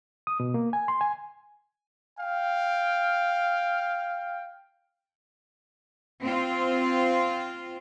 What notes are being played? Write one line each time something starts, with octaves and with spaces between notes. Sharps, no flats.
D#6
B2
A#3
G#5
C6
G#5
F5 G5
C4 F4